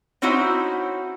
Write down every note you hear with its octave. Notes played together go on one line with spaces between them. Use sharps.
C4 C#4 D#4 E4 F#4 C5